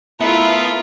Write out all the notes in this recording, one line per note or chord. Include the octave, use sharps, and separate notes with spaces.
A3 B3 E4 F4 A#4 E5